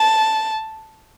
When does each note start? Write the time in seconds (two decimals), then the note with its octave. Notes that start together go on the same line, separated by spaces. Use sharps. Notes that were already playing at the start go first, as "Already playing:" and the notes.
Already playing: A5